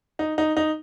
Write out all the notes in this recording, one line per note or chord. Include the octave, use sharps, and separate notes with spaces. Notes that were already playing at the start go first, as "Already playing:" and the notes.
D#4
D#4
D#4